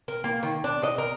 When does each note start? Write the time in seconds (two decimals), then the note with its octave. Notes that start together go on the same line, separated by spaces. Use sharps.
0.08 A#4
0.24 A#3
0.43 D#3
0.64 D4
0.83 D#5
0.98 A#4